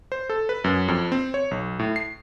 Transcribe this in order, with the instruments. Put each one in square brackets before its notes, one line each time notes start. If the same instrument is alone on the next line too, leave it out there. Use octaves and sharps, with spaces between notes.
[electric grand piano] C5
A4
B4
F#2
F2
C4
C#5
B1
A2
C7